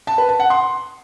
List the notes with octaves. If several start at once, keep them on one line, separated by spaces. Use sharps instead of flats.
A5
B4
A5
F#5
C6